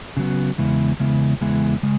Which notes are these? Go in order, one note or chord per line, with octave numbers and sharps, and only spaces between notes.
C#3 F#3 B3
E2 C#3 G#3 B3 E4
E2 C#3 G#3 B3 E4
E2 C#3 G#3 B3 E4
C#3 G#3